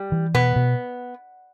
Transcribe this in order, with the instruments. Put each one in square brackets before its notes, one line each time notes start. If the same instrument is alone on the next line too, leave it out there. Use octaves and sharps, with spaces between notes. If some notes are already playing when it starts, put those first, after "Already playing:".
Already playing: [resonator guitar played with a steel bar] G3
[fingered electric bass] E3
[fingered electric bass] B2 [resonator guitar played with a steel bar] B3
[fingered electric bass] B2